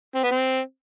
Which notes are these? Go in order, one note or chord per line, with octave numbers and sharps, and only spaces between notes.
C4
B3
C4